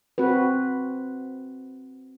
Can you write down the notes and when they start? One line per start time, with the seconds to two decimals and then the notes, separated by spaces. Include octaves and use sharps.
0.18 C4 F#4 B4